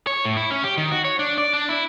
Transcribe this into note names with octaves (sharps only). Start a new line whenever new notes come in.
C#5
A2
E4
C#4
G4
D#3
F#4
C#5
D4
D5
D4
E4